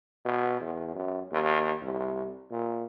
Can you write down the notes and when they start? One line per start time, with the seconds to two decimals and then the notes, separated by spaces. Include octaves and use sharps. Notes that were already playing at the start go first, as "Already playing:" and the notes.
0.25 B2
0.60 E2
0.95 F#2
1.32 D#2
1.82 C2
2.51 A#2